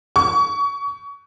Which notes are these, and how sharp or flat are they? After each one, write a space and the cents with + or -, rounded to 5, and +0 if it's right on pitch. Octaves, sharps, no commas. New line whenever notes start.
C#6 +30